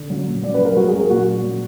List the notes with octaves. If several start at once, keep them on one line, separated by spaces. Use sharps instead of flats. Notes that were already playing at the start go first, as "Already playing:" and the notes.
Already playing: D3
F#3
A#2
F#3 D5
F#3 B4
A#4
F#3 F#4
G#4
F#3 A#4
A#2 F#4
A#2
F#3